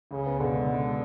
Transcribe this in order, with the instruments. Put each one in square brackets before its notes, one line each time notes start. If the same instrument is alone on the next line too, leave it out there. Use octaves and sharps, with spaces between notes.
[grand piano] C#2 [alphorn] C#3
[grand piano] B3
[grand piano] B2 [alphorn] D3
[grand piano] G#3
G#3